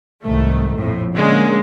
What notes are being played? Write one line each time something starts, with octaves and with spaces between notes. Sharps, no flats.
C2 G#2 D#3 A3
A#1 F2 A2
D3 G#3 A#3 C#4